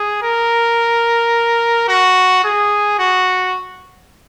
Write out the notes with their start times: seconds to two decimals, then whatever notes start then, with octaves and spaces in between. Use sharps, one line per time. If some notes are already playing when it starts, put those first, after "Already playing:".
Already playing: G#4
0.23 A#4
1.88 F#4
2.44 G#4
2.99 F#4